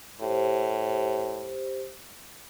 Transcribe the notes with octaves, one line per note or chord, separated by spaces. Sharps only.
A2 G4 C5